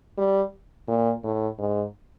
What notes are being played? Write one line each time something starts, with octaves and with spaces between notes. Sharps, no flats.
G3
A#2
A2
G#2